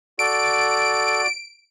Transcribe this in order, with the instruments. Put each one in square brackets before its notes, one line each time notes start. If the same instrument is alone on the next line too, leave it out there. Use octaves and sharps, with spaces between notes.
[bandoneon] F#4 D5 [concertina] A4 [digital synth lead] D7